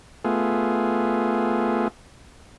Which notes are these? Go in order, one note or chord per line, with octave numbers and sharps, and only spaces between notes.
A3 B3 F4 G#4